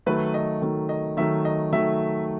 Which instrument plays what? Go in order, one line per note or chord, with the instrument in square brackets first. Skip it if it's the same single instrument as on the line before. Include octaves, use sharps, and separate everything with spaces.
[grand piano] D#3 F#3 A3 [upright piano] B4
[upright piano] D#5
[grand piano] D#3 F#3 A3
[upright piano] D#5
[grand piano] D#3 F#3 A3 [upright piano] E5
[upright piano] D#5
[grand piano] D#3 F#3 A3 [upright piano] E5